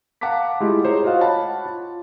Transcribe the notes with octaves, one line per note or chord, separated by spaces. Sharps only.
F5 F#5 A5 A#5 D6 B6
G#3 A3 E4 F4 G4
G#4 C5 C#5 A#5
F4 F#4 D#5 F5 F#5
C#5 F#5 A5 B5
F4